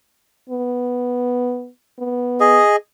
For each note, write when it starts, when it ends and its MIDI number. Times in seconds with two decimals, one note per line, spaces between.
0.49 1.69 59
1.99 2.60 59
2.40 2.76 68
2.40 2.76 75